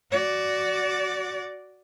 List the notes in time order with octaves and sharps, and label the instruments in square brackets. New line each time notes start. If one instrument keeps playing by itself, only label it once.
[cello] F#4 D5